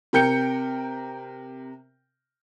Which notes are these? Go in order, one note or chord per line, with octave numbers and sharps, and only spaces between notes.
C3 A#4 G5 G6 C#7